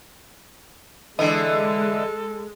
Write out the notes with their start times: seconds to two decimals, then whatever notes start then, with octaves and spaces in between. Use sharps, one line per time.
1.19 D3 E3 G#3 A4 D#5